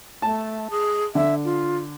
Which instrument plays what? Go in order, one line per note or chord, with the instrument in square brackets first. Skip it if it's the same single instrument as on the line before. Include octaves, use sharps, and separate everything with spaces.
[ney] A3 [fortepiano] A5
[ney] G#4
[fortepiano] D3 [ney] E5
[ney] F4